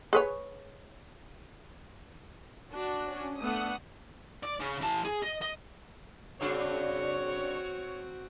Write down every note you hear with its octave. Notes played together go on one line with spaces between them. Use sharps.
G#4 B4 C#5
D4 F#4
C#4
A3 B3 D4 F#5 D#6
D5
C#3 C#4
E3 A5
G#4
D#5
D#5
G2 C#3 C4 D4 F#4 C#5